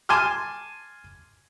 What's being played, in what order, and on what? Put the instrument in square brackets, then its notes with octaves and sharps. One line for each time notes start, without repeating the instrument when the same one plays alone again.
[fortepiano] G#5 A5 C6 D6 F6